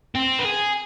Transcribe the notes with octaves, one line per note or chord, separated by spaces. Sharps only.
C4
B4
G#4